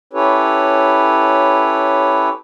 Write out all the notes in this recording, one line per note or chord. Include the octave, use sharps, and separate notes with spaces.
C#4 E4 G4 A4 B4 C#5